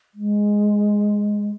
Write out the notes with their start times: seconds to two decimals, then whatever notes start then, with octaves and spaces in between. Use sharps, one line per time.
0.14 G#3